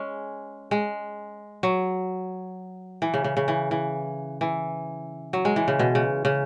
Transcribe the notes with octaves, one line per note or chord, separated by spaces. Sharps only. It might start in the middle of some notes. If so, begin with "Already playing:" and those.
Already playing: G#3 C#4
G#3
F#3
E3
C#3
C#3
C#3
E3
E3
E3
F#3
G#3
E3
C#3
B2
C#3
C#3